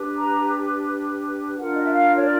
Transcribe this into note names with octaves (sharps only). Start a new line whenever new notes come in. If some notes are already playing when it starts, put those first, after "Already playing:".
Already playing: D4 G4 B4
A#5
D4 F4 A#4 F#5
D#5
E5
F5
C#5
D5